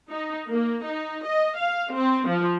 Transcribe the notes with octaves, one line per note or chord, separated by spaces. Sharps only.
D#4
A#3
D#4
D#5
F5
C4
F3